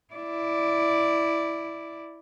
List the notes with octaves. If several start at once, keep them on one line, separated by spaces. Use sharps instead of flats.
E4 D5